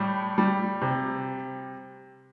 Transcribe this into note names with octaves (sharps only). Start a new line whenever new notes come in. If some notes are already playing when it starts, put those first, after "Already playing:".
Already playing: A2 G3
G3
C3